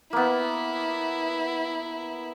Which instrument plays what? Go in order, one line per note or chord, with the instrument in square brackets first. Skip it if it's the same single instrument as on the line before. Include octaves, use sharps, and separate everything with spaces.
[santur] A#3 B3 [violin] E4